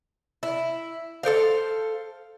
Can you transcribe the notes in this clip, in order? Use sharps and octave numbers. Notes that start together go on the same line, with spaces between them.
E4
A4 A#4 C5 F5